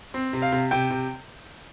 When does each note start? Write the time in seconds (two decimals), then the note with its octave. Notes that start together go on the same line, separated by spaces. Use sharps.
0.14 C4
0.33 C3
0.42 F5
0.52 C3
0.71 C3 G5
0.90 C3